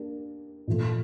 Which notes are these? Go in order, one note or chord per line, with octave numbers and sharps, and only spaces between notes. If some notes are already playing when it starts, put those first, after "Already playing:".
Already playing: A#3 D4 G4
A#2 F3 A3